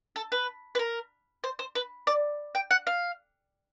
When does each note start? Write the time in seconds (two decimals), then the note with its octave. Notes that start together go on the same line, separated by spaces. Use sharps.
0.16 A4
0.32 B4
0.75 B4
0.79 A#4
1.44 C5
1.59 C5
1.75 B4
2.07 D5
2.55 G5
2.71 F#5
2.87 F5